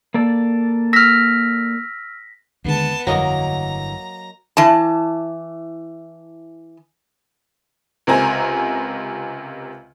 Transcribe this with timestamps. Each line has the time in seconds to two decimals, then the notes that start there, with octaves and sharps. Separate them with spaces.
0.14 A#3 A4 D5
0.93 E6 F6 A#6 B6
2.65 D#2 D3 G#3 B3 A5
3.07 G1 F2 D3 E3 F#3 A#3 D#5 A#5
4.57 E3 A5
8.07 C#2 C3 A#4 C5 G#5 A#5